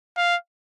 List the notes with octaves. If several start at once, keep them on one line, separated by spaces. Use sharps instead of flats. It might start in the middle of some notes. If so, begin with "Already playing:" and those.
F5